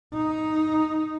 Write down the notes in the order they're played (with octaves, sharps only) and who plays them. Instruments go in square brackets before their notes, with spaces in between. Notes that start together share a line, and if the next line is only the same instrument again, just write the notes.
[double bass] D#4